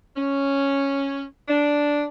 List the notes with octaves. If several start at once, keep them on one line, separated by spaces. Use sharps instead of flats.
C#4
D4